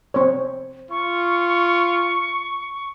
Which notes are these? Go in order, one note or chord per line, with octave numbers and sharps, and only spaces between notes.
C4 C#5
F4 C#6